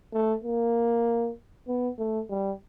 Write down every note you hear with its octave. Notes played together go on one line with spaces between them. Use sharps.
A3
A#3
B3
A3
G3